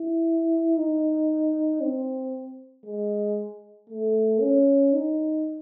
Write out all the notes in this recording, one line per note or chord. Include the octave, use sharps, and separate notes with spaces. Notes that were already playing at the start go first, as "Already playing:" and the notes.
Already playing: E4
D#4
C4
G#3
A3
C#4
D#4